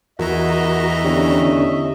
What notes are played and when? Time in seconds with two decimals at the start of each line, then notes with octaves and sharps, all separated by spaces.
0.19 E2 E3 F#4 A#4 D#5 E5 A#5
1.04 D3 B3 C#4 E4 G4